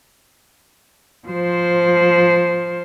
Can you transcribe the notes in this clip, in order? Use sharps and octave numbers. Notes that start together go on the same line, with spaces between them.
F3 C5